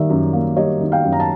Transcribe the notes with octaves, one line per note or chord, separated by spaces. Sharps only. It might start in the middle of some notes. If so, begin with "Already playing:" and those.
Already playing: D#3 G3 A#3 D5 E5
F#2
A#3
G3 C#5 D#5
D#3
F5 G5
F#2
A#5
A5